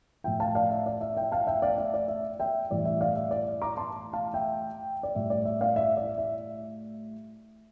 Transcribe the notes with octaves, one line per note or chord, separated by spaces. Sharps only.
A2 F3 E5 G5
F5 A5
D5 F5
E5
D5
E5
E5 G5
F5 A5
E5 G5
D5 F5
E5
D5
E5
E5 G5
A2 E3 G3 D5
E5
D5 F5
E5
D5
A#5 D6
A5 C6
F5 A5
E5 G5
D5
A2 G3 E5
D5
E5
D5 F5
E5
D5
E5